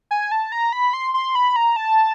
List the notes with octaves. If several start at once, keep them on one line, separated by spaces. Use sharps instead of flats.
G#5
A5
A#5
B5
C6
C6
B5
A#5
A5